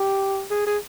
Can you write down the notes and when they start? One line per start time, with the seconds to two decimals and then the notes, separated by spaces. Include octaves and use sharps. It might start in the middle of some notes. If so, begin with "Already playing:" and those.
Already playing: G4
0.51 G#4
0.66 G#4